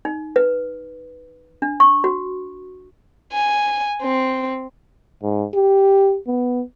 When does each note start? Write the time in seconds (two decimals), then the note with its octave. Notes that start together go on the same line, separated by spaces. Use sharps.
0.05 D#4
0.36 B4
1.62 D4
1.80 C#6
2.04 F#4
3.33 G#5
4.02 C4
5.23 G#2
5.54 G4
6.27 B3